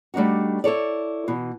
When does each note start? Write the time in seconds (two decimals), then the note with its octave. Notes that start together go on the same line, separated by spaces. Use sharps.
0.14 G3 A3 D4 D#4 F#4
0.64 E4 A4 C#5 D5
1.28 B2 E3